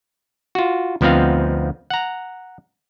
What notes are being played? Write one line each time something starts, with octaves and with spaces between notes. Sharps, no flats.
F4 F#4
D2 F3 B3 C4 D#4 F5
F#5 A#5